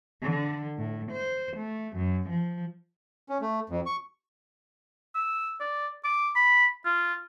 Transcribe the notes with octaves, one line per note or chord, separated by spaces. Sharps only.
D3
A2
C5
A3
F#2
F3
C#4
A3
F2
C#6
E6
D5
D6
B5
F4